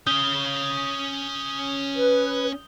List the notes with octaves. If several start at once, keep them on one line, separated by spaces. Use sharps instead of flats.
C#4 F5 D#6 G6 G7
B4